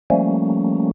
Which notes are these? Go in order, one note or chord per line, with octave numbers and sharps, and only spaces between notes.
F3 G3 A3 A#3 C#4